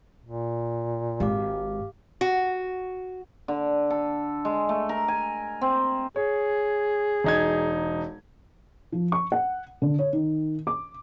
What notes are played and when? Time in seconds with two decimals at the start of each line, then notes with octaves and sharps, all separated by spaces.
0.25 A#2
1.20 G#1 G#3 G4 F5 D6
2.21 F#4
3.48 D3
3.90 A4
4.45 G#3
4.69 A3
4.89 A#4
5.08 G#5
5.61 C4
6.16 G#4 C#5
7.24 E1 D#4 G#6
8.92 F3
9.12 C#6
9.32 F#5
9.82 D3
9.99 C#5
10.13 D#3
10.67 D6